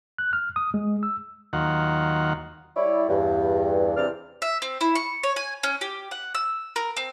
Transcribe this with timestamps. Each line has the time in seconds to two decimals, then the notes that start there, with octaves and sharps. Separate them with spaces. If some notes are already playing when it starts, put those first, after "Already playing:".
0.18 F#6
0.33 F6
0.56 D#6
0.74 G#3
1.03 E6
1.53 D#2 D#3 F#3 F4 F#5
2.77 G3 E4 C#5 D5
3.09 E2 G2
3.97 C3 E3 C4 D4 D5 F6
4.42 E5
4.62 C4
4.81 E4
4.95 C#6
5.23 C#5
5.36 G#5
5.63 C#4
5.81 G4
6.11 F#5
6.35 E6
6.76 A#4
6.97 C4